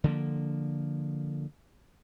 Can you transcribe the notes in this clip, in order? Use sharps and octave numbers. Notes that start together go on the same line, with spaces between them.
D3 F3 A3 A#3